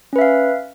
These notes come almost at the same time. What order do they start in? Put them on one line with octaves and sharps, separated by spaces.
C#4 B4 E5 F5